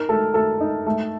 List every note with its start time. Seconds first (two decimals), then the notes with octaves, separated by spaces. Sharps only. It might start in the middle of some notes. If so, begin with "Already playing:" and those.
Already playing: D#4 A#4
0.09 A3 A4
0.34 A3 A4
0.60 D#4
0.86 A3